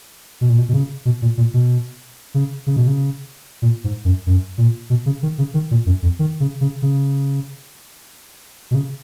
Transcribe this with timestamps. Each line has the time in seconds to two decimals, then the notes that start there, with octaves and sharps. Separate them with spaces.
0.41 B2
0.50 A#2
0.58 B2
0.69 B2
0.73 C#3
1.05 B2
1.22 A#2
1.38 A#2
1.54 B2
2.34 C#3
2.67 C#3
2.76 B2
2.88 C#3
3.62 A#2
3.84 G#2
4.05 F#2
4.27 F#2
4.58 A#2
4.90 B2
5.06 C#3
5.23 D#3
5.38 C#3
5.54 D#3
5.71 A#2
5.86 F#2
6.02 F2
6.19 D#3
6.40 C#3
6.61 C#3
6.82 C#3
8.71 B2
8.75 C#3